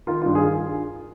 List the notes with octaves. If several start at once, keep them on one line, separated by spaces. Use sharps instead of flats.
D#3 F4
G2 F4
G#4